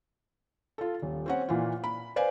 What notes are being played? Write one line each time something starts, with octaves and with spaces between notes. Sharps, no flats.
F4 A4
D#1
C4 C#4 F#5
A#2 E3 F4
B5
B4 C5 D5 F5 G#5